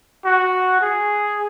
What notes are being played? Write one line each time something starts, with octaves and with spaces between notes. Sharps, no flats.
F#4
G#4